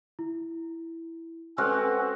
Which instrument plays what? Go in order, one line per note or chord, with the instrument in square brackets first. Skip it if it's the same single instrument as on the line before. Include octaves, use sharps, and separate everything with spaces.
[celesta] E4
[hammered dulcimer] G#3 C4 F#4 [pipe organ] C#4 A4 B4 [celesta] F6 F#6